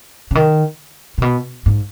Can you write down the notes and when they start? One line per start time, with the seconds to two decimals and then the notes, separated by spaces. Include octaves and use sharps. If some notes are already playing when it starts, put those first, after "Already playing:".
0.31 C#3
0.35 D#3
1.18 A#2
1.22 B2
1.66 G#2